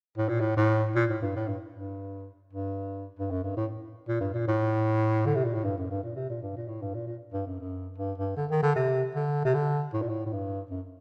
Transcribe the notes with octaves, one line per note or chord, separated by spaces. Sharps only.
A2
A#2
A2
A2
A#2
A2
G2
A2
G2
G2
G2
G2
F#2
G2
A2
A#2
G2
A#2
A2
D3
C3
A#2
A2
G2
F#2
G2
A#2
C3
A#2
G2
A#2
A2
G2
A#2
A#2
G2
F#2
F#2
G2
G2
D3
D#3
D3
C3
D3
C3
D3
A2
A#2
A2
A2
G2
F#2